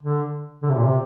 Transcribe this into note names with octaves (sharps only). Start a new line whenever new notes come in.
D3
D3
C3
A#2
C3